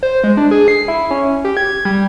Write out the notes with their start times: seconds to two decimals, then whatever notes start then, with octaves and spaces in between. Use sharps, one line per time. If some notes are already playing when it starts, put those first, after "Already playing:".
0.03 C5
0.24 G#3
0.37 D4
0.51 G#4
0.68 C7
0.88 E4
1.11 C#4
1.45 G4
1.57 G#6
1.85 G3